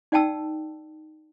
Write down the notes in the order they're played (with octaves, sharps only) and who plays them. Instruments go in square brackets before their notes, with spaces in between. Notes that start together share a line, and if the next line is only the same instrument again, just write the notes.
[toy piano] D#4 D5 F#5 G5 A5 E6